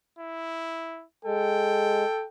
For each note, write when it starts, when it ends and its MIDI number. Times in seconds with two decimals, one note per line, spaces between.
0.19 1.04 64
1.25 2.04 56
1.25 2.26 69
1.25 2.28 79